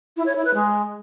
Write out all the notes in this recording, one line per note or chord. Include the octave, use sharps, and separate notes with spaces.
E4
C#5
E4
B4
G#3